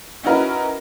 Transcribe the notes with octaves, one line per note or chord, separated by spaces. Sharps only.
C#4 D#4 E4 F#4 A#4 B4